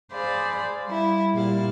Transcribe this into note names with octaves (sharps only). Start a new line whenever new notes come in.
G#4 C5 D5 F5 B5
G3 E4
A#2 G3 E4 F5